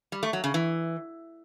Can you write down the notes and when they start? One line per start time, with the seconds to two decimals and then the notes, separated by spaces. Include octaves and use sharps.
0.12 G3
0.23 A3
0.33 F#3
0.44 C#3
0.54 E3